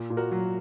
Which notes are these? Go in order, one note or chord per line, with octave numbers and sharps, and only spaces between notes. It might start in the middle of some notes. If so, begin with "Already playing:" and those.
Already playing: A#2
A#2
F#4 A#4
F#3